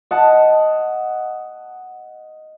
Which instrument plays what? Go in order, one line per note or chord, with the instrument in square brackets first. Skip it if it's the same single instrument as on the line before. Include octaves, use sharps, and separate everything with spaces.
[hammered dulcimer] D#5 F#5 A5